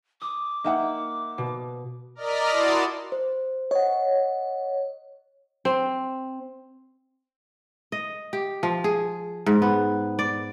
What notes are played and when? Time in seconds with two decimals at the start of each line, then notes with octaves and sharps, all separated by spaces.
0.22 D6 D#6
0.64 A#3 D#4 E5 F#5
1.38 B2
2.15 A#4 D5 D#5 F6 B6
2.50 E4 F#4 D5 A5 C6 D#6
3.12 C5
3.71 C#5 D#5 F#5
5.65 C4
7.92 D#5
8.33 G4
8.63 F3
8.84 G#4
9.46 G#2
9.62 B3
10.19 D5